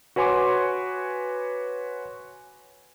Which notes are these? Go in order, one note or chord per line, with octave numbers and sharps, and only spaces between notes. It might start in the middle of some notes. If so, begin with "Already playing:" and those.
F#4 B4 C#5 G#5 C6 D6